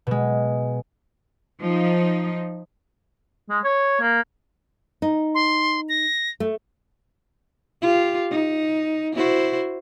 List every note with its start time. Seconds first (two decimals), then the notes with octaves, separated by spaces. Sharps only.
0.07 B2 G#3
1.60 F3 D#4
3.50 G#3
3.64 C#5
4.00 A#3
5.02 D#4
5.35 C6
5.89 A#6
6.40 A3
7.81 F4 G4
8.30 D#4
9.15 E4 F#4 C5